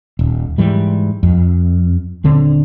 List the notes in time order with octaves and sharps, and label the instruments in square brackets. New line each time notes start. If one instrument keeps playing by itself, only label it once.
[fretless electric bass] D#1
G#2 E3 G3
F2
D#1 D3 C4 D4